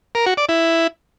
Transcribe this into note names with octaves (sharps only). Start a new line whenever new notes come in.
A#4
F#4
D5
E4